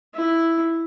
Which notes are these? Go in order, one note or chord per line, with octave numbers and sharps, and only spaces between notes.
E4